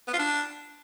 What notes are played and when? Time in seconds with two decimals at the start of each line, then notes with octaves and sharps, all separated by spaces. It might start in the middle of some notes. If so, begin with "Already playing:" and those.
0.08 B3
0.13 F4
0.19 D4